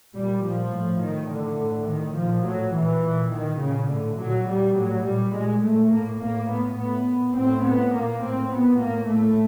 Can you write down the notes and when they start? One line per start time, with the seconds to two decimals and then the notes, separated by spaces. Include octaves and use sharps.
0.15 A#2 G3
0.43 A#2 F3
0.73 A2
1.01 A2 D#3
1.30 A2 D3
1.59 A2
1.87 A2 D#3
2.16 A#2 F3
2.45 A2 F#3
2.74 A#2 E3
3.03 A#2
3.32 A#2 D#3
3.61 A#2 C#3
3.89 A2 D3
4.18 A#2 F#3
4.47 A#2 G3
4.76 A2 F#3
5.05 A#2 G3
5.33 A#2 G#3
5.62 A#2 A3
5.91 A2 A#3
6.20 A2 A#3
6.49 A2 B3
6.78 A2 B3
7.07 A#2
7.35 A2 C4
7.64 A2 B3
7.94 A#2 A#3
8.23 A2 C4
8.51 A#2 B3
8.80 A2 A#3
9.09 A2 A3